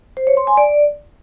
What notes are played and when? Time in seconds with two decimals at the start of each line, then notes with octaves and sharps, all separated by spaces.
0.17 C5
0.27 C#5
0.37 C6
0.47 G#5
0.57 D5